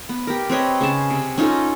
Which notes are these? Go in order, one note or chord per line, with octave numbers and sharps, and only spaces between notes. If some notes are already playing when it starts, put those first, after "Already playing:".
B3
G4 A#4
C4 B4 C#5 D#5
C#3 G#4 A5
C3
C#4 D#4 F4 A4